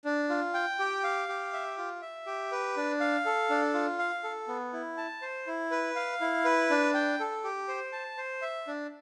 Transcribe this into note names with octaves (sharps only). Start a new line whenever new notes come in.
D4
F4
G5
G4
F5
G4
E5
F4
E5
G4
B4
D4
F5
A4
D4
F4
F5
A4
B3
E4
A5
C5
E4
B4
F5
E4
B4
D4
G5
A4
G4
C5
A5
C5
E5
D4